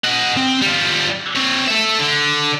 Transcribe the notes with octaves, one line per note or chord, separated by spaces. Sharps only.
D#5 F#5
C4
G3 F4
C4 C#5
A4 E5
D3